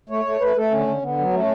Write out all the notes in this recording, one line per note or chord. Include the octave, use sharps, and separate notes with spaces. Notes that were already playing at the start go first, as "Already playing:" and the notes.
A3 C#5
A3
A3 B4
A3 A4
D3 C#4
D3
D3 B3
F#3
A3 C#4